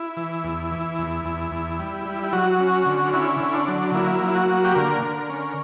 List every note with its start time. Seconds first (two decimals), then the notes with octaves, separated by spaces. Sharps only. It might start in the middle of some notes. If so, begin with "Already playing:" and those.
Already playing: E4
0.17 E3
0.44 E2
0.72 E3
0.98 E2
1.25 E2
1.52 E2
1.79 G3
2.05 G3
2.24 E4
2.32 F#3 F#4
2.60 C#4
2.86 D3
3.13 C#4 E4
3.40 D3
3.55 D4
3.68 F#3
3.94 A#3 E4
4.22 F#3
4.27 E4
4.35 F#4
4.49 A#3
4.64 G4
4.75 D3 A#4
5.02 D3
5.16 A#4
5.29 C#4